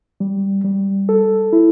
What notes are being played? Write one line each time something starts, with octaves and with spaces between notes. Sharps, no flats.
G3
G3
A4
E4